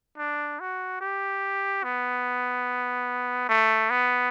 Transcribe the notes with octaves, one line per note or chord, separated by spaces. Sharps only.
D4
F#4
G4
B3
A3
B3